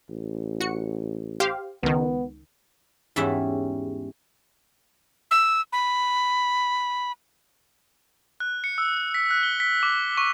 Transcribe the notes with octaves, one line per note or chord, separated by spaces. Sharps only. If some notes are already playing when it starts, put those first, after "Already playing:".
A1
F#4 C#7
G4 C5 F5
C#2 D#3 B3
E2 G#2 G3 C#4 E4 E5
E6
B5
F#6
C#7
E6
B6
F#6
G7
B6
D6
C#6